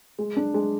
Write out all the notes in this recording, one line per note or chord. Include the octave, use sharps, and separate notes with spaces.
G#3
D4
G#3